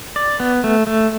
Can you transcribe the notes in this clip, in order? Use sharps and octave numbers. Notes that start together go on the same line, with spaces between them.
D5
B3
A3
A3